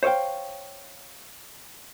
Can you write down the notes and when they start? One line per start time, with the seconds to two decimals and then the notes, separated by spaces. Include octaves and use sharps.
0.03 C5 C#5 D#5 F5 G5